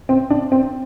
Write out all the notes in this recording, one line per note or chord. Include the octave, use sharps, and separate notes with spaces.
C4
D4
C4